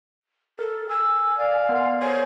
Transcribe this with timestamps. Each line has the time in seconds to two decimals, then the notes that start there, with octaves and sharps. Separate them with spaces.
0.59 A4 A#4
0.89 G#5 E6
1.37 D5 F5
1.69 B3 A#4 C6
2.02 C5 C#5 G#5